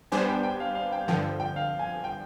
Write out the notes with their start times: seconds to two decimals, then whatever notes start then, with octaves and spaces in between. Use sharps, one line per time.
0.12 G3 B3 D4 G4 C5 G#5
0.29 G5
0.43 G5
0.60 F5
0.75 F5
0.92 G5
1.08 G2 D3 F3 G5
1.40 G5
1.56 F5
1.79 G#5
2.04 G5